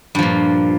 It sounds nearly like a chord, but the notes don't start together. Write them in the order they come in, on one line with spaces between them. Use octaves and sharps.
G2 F3 A#2